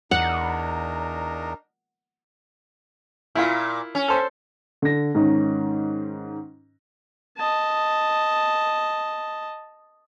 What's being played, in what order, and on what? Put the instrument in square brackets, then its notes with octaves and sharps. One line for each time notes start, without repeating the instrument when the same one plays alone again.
[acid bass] E2 [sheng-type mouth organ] D4 D#4 A#4 [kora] F#5
[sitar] A#2 [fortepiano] E4 F4
[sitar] C#4
[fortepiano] A4 C5
[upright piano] D3 A#6
G#2 D#3 C#4
[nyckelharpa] D#5 A5